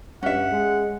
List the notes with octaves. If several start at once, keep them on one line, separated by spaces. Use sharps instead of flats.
G2 C#4 E5 F#5
G#3